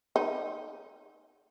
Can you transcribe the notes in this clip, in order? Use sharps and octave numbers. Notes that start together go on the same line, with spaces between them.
D#4